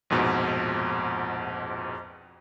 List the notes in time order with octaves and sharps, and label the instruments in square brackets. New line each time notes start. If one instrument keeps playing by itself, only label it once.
[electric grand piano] A#1 F2 G#2 B2